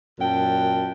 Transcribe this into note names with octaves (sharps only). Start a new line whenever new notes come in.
F#2 A#2 G5 A5